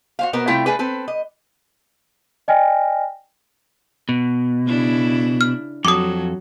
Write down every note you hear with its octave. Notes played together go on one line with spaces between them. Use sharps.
F#4 C5 F5
B2 B3 A#4 C5
C3 G3 A3 E4 F4 G5
A3 D4 G#4 B4
C4 A4 B4
D#5
D5 D#5 G5 G#5 F6 A#6
B2
C#3 D4 E4
F6
F2 F#3 A4 D6 D#6